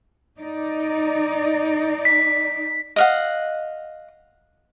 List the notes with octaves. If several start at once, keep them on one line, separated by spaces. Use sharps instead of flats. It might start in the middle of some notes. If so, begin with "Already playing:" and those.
D#4 D5
B6
D#5 F5 F#5